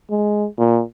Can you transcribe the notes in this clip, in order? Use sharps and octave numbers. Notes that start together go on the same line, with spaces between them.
G#3
A#2